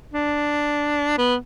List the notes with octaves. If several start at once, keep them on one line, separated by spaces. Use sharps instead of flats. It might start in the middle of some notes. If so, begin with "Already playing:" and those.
D4
B3